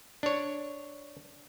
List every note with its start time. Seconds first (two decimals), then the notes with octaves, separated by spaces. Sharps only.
0.23 D4 C#5